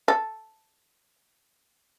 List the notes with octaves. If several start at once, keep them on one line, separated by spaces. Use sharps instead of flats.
A4